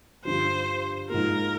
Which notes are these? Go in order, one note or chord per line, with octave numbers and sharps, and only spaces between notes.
G2 D3 F3 C5
G#2 F3 A#3 A#4